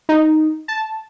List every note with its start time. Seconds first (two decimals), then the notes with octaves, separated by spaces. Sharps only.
0.09 D#4
0.68 A5